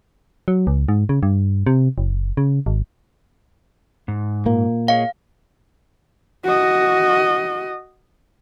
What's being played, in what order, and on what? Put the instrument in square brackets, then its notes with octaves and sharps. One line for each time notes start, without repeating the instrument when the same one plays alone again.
[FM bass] F#3
C#2
G#2
C#3
G2
C3
F#1
C#3
G#1
[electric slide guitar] G#2
[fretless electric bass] A#2 A#3
[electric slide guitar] G#4 C#5 D#5 [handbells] F5
[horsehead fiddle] F#4 D#5